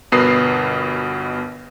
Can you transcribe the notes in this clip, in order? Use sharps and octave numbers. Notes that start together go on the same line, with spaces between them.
G1 B2 A#4 B4 D#6 C7